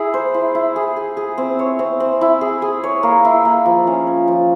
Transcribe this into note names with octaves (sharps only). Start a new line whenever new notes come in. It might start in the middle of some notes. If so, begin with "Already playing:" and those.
Already playing: E4 G#4
C5
E4
E4
G#4
G#4
G#4
C4
C#5
C4
C4
E4
G#4
G#4
C#5
A#3
E4
A#3
F3
C#4
C#4
F3